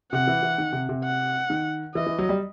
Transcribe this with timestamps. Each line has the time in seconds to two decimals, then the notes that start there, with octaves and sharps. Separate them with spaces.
0.12 C3 F#5
0.27 E3
0.43 E3
0.58 D#3
0.73 C3
0.89 C3
1.04 F#5
1.50 D#3
1.95 E3 D#5
2.06 E3
2.18 F#3
2.29 G3